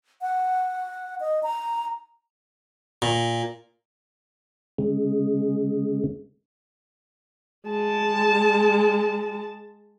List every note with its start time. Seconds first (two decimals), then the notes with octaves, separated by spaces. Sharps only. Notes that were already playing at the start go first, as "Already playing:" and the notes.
0.22 F#5
1.21 D#5
1.43 A#5
3.02 A#2
4.78 C#3 G#3
7.67 G#3 A5